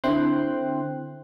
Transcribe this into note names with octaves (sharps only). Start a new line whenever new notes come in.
D3 C4 E4 G5 C6 F#6